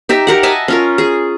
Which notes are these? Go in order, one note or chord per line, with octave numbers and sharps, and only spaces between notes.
D#4 G4 E5
G4 A#4 F#5
D#5 E5 G#5 A5
C#4 F4 A#4
G#4